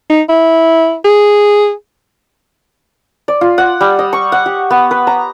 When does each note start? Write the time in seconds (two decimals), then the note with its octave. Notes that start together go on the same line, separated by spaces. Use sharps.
0.10 D#4
0.29 E4
1.05 G#4
3.28 D5
3.41 F4
3.58 F#5
3.81 G3
3.99 D#5
4.13 C#6
4.32 F#5
4.46 G4
4.70 B3
4.91 B4
5.07 A#5